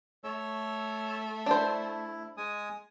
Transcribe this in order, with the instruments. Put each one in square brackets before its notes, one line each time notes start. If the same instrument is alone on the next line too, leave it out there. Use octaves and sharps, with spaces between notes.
[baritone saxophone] A3 [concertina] C#5 E6
[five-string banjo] D4 C5 [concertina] E4
[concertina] G#3 G#5 D#6